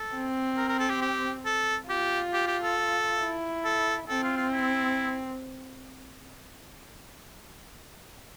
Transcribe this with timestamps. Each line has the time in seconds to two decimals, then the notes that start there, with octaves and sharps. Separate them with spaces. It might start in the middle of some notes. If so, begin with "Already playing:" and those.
Already playing: A4
0.14 C4
0.57 A#4
0.69 A#4
0.80 A4
0.90 G4
1.02 G4
1.46 A4
1.89 F4 G4
2.33 G4
2.47 G4
2.62 A4
3.20 E4
3.65 A4
4.09 C4 A4
4.23 F4
4.37 F4
4.52 E4